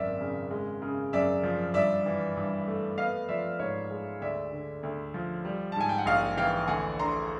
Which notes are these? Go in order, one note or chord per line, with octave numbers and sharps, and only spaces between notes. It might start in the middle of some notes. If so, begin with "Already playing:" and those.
Already playing: G#1 F#2 D5 E5
C#3
G#3
C#3
F#2 D5 E5
F3
G2 D5 E5
E3
G2
A3
B3 D#5 F5
F3 D5 E5
G#2 C#5 D#5
G#3
D2 D5 E5
D3
D2
F3
G3
A5
G#2 G#5
G5
F#5
A#1 D#5 F5
E3 F5 G5
D2 F#5 G#5
D3 A#5 C6